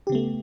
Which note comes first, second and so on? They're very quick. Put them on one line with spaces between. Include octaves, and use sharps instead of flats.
G4 C#3 B3 A3